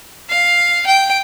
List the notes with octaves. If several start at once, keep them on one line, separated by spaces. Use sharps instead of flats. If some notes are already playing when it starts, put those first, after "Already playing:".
F5
G5